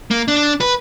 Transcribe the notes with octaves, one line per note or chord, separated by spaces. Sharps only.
A#3
D4
B4